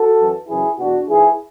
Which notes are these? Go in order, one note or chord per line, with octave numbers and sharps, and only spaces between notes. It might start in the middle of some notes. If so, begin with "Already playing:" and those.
Already playing: F#4 A4
F#2 E3
F#2 C#3 E3 E4 G#4
E2 B2 D4 F#4
G#2 E3 E4 G#4